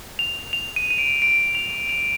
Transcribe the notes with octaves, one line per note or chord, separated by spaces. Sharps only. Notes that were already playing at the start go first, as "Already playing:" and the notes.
F7
F7
D#7
D#7
D7
D7
F7
F7